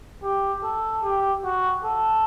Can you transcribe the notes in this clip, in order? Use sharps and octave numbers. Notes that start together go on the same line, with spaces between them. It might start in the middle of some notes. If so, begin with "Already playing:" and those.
G4
A4
G4
F#4
A4